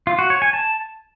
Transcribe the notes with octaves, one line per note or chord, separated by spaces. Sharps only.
F4
F#4
C#5
G#5
A5